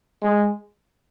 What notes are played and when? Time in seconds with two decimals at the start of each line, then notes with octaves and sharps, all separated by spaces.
0.22 G#3